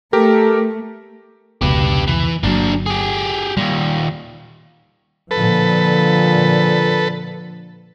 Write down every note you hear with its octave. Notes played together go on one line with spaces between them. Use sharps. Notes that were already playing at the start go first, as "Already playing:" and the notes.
A3 G4 A4 A#4
F1 C#2 B2 G4 B4
E3
G1 F#3 A#3 D4
G4 G#4
D#2 A#2 G3
A#2 D3 F3 A4 B4